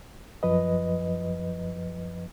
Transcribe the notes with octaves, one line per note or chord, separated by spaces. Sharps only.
F#2 F3 B4 D#5